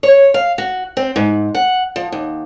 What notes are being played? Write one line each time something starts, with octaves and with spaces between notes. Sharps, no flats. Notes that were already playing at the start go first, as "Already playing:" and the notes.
C#5
F5
F#4
C4
G#2
F#5
F3
D#2